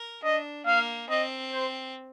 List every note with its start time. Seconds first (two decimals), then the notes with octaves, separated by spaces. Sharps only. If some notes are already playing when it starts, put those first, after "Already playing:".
Already playing: A#4
0.23 D4 D#5
0.66 A#3 F5
1.09 C4 D#5
1.53 C5